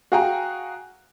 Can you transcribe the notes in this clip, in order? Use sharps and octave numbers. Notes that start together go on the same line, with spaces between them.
F#4 G#4 F5 G5 G#5 A#5